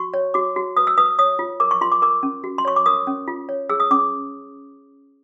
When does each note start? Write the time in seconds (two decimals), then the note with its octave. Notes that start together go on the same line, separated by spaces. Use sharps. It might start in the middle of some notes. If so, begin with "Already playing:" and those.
Already playing: F#4 C#6
0.14 C#5
0.34 F#4 D6
0.56 F#4
0.77 B4 D#6
0.87 E6
0.97 B4 D#6
1.19 C#5 D#6
1.39 F4
1.60 A#4 D6
1.71 C#6
1.81 F4 C6
1.92 D6
2.02 A#4 D6
2.23 C#4
2.44 F#4
2.58 C6
2.65 C#5 C#6
2.76 D6
2.86 A#4 D#6
3.07 C#4
3.28 F4
3.49 C#5
3.70 G#4 E6
3.80 D#6
3.91 C#4 D6